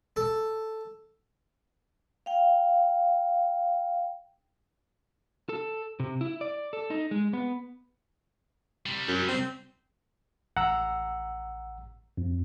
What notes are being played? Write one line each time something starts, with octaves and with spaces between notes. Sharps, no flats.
A4
F5 G5
A4
C3
E4
D5
A4
D#4
G#3
B3
C3 G3
F#2
C4
A1 F#5 A#5 E6
F2